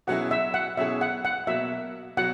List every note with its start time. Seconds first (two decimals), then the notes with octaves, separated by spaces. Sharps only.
0.07 B2 F#3 C#4 E4 G#4 F#5
0.31 E5
0.54 F#5
0.77 B2 F#3 C#4 E4 G#4 E5
1.01 F#5
1.25 F#5
1.47 B2 F#3 A#3 E5
2.17 B2 F#3 F#5